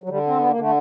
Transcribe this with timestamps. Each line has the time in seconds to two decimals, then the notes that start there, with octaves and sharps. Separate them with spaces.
0.04 F#3
0.09 D3 G3
0.27 C4
0.38 B3
0.49 A#3
0.56 D3 A3